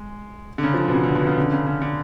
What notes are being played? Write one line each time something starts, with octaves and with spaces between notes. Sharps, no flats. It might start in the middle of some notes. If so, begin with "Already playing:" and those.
Already playing: G#3
D3
C#3
F3
D3
B2
C#3
D3
B2
C#3
D3
C#3
C#3
D3